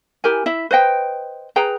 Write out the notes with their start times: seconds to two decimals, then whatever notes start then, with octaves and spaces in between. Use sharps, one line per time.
0.24 E4 G4 A#4 G#5
0.46 E4 E5
0.71 B4 C5 D#5 G5
1.56 G#4 B4 G5 A#5